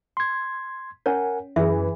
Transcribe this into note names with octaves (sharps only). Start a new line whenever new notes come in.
C6 G#6
C#4 A#4 C#5 F#5 G#5
F#2 E3 G#4 E5